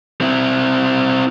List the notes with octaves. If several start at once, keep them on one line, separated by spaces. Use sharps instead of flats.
C4 E4